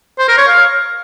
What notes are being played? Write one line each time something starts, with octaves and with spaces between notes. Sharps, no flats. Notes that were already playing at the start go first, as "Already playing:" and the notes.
C5
A#4
C#5
F5